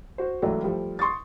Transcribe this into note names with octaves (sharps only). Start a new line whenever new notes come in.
F#4 C5
C#2 E3 F#3 A3 D5
F3 G3 A3
C6 C#6 D#6 A6